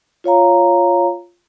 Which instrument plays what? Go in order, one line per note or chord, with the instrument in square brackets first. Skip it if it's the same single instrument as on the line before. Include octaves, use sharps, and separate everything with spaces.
[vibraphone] F4 C#5 F5 A#5